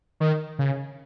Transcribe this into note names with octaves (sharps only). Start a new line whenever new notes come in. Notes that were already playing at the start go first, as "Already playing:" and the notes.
D#3
C#3